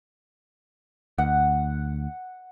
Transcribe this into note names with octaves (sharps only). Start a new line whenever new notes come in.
D2 F#5